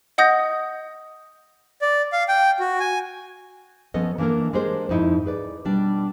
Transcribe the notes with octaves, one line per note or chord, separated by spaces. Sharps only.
D#5 F#5 D#6 G6 A#6
D5
F5
G5
F#4
G#5
F3 B3 C#4 A4 D#5
E3 A#3 D4 A4 A#4
G#3 D4 G4 G#4 A#4 C5
F2 G#2 D#4 E4
G#4 B4 D5
B2 G3 D4